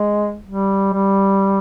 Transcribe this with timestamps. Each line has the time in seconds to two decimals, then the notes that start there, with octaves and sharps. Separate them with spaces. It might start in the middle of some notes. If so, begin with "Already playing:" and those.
Already playing: G#3
0.47 G3
0.93 G3